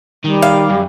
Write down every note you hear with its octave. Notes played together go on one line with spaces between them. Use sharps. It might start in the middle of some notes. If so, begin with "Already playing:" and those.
D#3 G3
F5
F#2